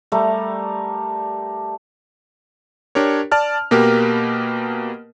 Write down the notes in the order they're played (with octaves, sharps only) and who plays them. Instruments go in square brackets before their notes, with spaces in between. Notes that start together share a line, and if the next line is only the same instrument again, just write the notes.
[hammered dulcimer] G3 A3 A#4
[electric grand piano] D4 G4 A#4 C#5
D5 A5 F6
B2 A#3 G4 A#4 B4